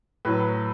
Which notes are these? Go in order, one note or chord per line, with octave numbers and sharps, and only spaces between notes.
A2 F#3 B4